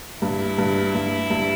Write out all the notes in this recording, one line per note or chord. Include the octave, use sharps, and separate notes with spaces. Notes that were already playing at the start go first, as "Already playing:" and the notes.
G2 E4
G2
G2
G2